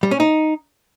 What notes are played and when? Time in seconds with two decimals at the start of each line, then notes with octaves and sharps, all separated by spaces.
0.03 G3
0.11 C#4
0.20 D#4